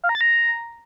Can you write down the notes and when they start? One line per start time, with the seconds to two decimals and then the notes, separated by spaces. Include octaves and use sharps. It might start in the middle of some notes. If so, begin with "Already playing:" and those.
0.04 F5
0.09 A#5
0.15 A6
0.21 A#5